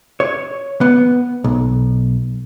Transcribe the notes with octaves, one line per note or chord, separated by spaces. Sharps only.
C#5
B3
B1